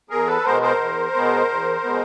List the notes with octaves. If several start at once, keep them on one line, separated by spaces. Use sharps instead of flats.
E2 G#4 A#4
A4 B4
B2 G#3 B3 A#4 C5
A#4 C5
E2
B2 G#3 B3
E2
B2 G#3 B3